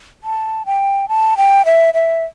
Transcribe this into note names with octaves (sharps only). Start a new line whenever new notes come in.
A5
G5
A5
G5
E5
E5